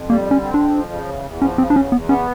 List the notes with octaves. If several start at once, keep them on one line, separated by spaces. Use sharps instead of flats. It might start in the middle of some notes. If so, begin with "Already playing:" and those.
Already playing: F2
G3 A#3
D3
C#4
C4
F2 D4
F3
C#3
E2
E2
F3 C#4
C#3 C4
D4
E2 C#4
E2 B3
B3 C#4